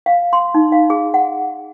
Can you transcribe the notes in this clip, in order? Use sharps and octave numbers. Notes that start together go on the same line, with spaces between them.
F5
C6
D#4
F5
G#4
F#5